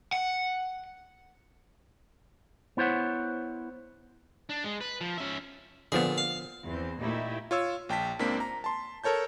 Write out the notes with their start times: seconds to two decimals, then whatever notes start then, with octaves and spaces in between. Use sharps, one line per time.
0.13 F#5
2.77 B3 E4 C5 C#5 F#5
4.49 D4
4.64 G#3
4.81 B4
5.01 F3
5.18 C#4 E5
5.92 A#2 D3 F3 B3 G#4
6.18 F5
6.64 E2 C4
7.00 A#2 A3 D#4 E4 G4
7.51 F4 C#5 E6
7.89 A#1 G5 A5 B6
8.19 C#2 A#3 C4 D4 B6
8.40 A#5
8.64 A5 C6
9.04 A4 A#4 C#5 A5 G6